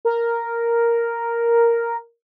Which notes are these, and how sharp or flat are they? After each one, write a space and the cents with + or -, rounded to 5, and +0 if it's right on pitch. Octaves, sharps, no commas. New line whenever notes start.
A#4 +0